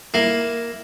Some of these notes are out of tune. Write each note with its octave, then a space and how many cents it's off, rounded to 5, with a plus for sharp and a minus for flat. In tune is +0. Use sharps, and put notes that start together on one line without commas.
A#3 +0 E4 +0